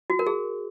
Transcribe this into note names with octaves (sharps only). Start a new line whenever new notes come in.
F#4
A#4
G#4